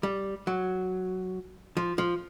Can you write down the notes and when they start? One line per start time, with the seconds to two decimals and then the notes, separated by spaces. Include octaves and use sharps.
0.03 G3
0.47 F#3
1.77 F3
1.98 F3